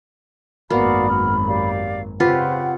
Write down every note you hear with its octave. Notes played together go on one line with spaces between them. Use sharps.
G#1 F#2 A#3 B3 F#4 D5 F5 B5
F#4 F6
G4 D5 F5
C#3 C4 F4 G4 B4 C5 F#5